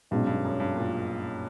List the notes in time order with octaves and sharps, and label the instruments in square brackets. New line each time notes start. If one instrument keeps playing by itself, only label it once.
[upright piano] B1 B2 G#3 C#4 [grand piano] G2
[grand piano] G2
F#2
G2
A#2